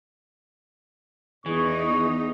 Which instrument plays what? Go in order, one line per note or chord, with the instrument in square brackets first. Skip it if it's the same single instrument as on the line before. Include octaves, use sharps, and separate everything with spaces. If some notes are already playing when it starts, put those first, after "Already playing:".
[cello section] E2 D#4 [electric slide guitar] E3 [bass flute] G#4 [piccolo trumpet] C#6